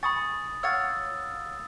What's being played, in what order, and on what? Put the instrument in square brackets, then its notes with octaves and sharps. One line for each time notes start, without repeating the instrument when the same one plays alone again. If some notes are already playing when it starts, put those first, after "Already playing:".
[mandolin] G#5 C#6 [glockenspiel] B5 D#6 A6
[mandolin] C#5 F5 F#5 [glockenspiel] E6 A6